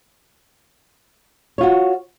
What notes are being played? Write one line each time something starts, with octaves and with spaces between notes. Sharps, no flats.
F4 F#4 C#5